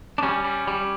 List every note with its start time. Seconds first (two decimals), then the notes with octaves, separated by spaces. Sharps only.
0.18 D4
0.23 G3 C#4
0.44 G3
0.67 G3